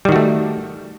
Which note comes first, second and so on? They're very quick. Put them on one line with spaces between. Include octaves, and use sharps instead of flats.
G3 D#3 F#4 A3